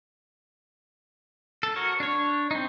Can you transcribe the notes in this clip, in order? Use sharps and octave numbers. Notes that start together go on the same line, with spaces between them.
A4
F#4 A#4 C#5
D4 C#5
C4 D#4